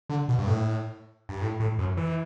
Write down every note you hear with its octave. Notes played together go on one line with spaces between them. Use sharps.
D3
B2
G2
A2
G2
A2
A2
F#2
E3